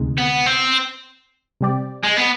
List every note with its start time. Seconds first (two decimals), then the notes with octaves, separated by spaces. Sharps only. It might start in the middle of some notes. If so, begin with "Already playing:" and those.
Already playing: D2 C3 D#3 G#3
0.18 B3
0.46 C4
1.61 C3 G3 C4 G4 D5
2.04 G#3
2.17 B3